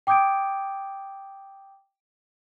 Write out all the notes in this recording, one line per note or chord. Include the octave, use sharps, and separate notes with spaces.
G5 D6 D#6 G6 G#6 D7